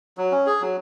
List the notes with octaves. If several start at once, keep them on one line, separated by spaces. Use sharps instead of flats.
F#3
C#4
G#4
F#3